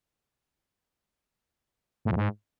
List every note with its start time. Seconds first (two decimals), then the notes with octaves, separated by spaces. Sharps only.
2.05 A2
2.11 F2
2.16 G#2